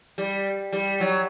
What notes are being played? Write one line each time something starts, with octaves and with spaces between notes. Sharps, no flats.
G3
G3
F#3